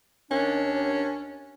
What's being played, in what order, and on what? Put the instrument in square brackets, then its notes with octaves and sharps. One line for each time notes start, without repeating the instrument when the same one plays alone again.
[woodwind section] D#2 D4 [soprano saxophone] C#4